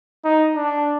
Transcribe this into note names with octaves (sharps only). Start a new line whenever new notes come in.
D#4
D4